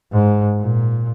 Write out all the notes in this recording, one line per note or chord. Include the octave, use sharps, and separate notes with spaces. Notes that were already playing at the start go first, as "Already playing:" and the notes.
G#2
A#2